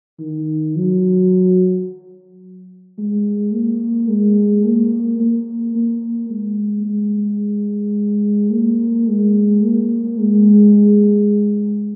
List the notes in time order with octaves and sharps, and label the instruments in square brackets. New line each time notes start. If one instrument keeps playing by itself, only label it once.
[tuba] D#3
F#3
G#3
A#3
G#3
A#3
A#3
A#3
G#3
G#3
A#3
G#3
A#3
G#3